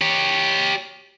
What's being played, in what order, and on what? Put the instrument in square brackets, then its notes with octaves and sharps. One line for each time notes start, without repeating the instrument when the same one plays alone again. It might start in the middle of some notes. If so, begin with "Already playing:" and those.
[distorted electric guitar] G4 C#5